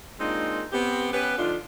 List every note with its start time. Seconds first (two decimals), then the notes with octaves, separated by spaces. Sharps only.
0.20 G#3 A#3 C4 D4 D#4 F4
0.72 B3 C4 G4
1.12 B3 C#4 G4 B4
1.38 D3 F3 D4 D#4 F4